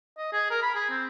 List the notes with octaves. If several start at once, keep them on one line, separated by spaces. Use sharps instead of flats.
D#5
G#4
A#4
B5
G#4
C4